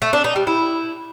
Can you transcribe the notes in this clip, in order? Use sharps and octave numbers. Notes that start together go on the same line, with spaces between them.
A3
D4
D#4
G3
E4